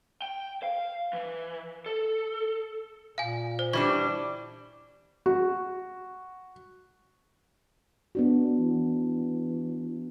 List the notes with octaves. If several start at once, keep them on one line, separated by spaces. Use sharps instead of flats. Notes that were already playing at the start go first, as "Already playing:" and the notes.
G5
F5
E3
A4
A#2 F5 G#5
C5
E3 G3 D4 C5 C#6 G#6
F#4
B3 D4 F#4
E3